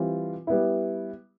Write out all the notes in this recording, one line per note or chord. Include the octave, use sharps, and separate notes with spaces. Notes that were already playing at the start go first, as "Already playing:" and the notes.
Already playing: E3 G3 C4 F4
G3 B3 E4